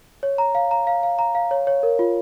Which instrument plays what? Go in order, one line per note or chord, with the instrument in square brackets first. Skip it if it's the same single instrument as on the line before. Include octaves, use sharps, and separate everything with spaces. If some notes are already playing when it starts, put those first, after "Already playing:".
[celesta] C#5
A#5
F5
A#5
F5
F5
A#5
F5
C#5
C#5
A#4
F4